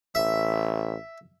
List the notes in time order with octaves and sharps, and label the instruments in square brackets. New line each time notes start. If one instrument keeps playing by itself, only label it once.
[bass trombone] A1 [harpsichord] E5